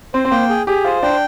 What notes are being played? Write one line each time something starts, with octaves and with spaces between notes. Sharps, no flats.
C4 C5
C4
A#3 G5
G#4
G4 G#4
F4 C5
D4 G5